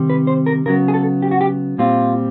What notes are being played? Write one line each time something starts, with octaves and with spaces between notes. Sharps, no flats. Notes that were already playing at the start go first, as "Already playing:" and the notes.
Already playing: C3 D#3 G3 C4
B4
C5
A#4
C#3 F#3 B3 A#4
G#4
A4
G4
F#4
G4
A#2 G3 C4 F4